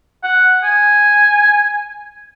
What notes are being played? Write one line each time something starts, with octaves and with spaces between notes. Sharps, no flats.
F#5
G#5